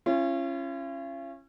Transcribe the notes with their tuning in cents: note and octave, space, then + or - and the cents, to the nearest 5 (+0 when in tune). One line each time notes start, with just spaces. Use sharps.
C#4 -20 F4 -45